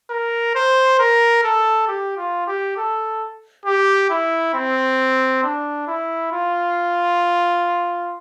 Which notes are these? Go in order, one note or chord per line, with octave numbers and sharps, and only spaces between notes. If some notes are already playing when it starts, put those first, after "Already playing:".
A#4
C5
A#4
A4
G4
F4
G4
A4
G4
E4
C4
D4
E4
F4